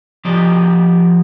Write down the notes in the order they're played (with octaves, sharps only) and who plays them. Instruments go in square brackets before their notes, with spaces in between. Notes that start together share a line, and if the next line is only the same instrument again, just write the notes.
[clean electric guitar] F3 F4 G4 D5 D#5